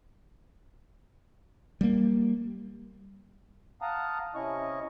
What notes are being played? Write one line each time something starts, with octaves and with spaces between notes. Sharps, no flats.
G3 A#3
F5 F#5 A5 A#5 D#6
C3 C#4 E4 D#5 C#6